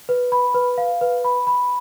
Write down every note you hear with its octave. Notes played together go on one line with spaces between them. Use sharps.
B4
B5
B4
F5
B4
B5
B5